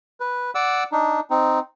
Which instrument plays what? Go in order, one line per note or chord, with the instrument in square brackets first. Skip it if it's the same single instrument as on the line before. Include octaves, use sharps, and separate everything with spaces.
[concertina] B4
D5 F#5 D6 E6
D4 D#4
C4 D#4